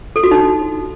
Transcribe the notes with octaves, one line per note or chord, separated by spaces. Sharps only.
A4
F#4
D#4